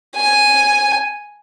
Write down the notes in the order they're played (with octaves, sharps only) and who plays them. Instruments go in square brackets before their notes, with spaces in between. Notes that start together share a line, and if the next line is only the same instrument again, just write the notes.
[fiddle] G#5